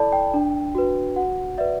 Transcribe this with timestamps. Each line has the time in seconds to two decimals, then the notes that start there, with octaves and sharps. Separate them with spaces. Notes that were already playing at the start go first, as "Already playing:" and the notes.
Already playing: E4 A4 D5 A5 B5
0.12 G5
0.34 D4
0.75 F#4 B4
1.16 F#4 F#5
1.58 B4 D5 E5